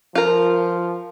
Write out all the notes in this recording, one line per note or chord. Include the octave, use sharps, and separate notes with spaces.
F3 F4 A#4